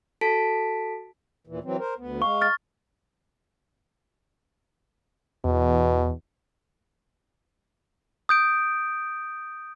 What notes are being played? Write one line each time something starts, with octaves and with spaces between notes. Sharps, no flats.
F#4 A4 A5 B6 D7
D#2 A#2 E3
E3 F#3 C4
A#4 C5
D2 B3
G#3 F5 C#6
F6 A6
E2 B2
D#6 G6 D7